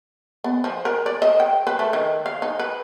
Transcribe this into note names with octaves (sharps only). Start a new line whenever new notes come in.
B3
F3
A#4
D5
D#5
G5
B4
A3
D#3
F5
D#4
B4